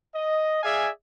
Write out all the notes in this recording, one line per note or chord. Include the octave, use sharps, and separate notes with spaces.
D#5
G#4 D5 E5 F5 G#5